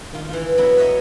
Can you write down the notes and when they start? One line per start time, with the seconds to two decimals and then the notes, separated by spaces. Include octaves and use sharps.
0.13 D#3 F4
0.29 E3 F4
0.58 F#3 B3 E4
0.77 B4 C#5 D#5 E5 A#5